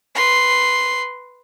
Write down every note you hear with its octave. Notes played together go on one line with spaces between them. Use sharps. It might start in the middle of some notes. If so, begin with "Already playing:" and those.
B4 C6